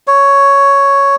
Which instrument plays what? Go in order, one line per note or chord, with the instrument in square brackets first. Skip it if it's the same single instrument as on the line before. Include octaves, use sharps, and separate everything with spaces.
[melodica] C#5